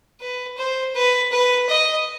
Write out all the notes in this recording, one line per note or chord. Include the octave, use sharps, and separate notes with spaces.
B4
C5
B4
B4
D#5